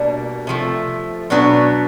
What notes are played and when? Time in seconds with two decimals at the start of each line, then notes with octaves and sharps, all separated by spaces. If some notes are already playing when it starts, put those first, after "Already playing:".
Already playing: B2 G3 A#3 D4
0.47 C3 F3 A3
1.30 B2 F#3 B3 D4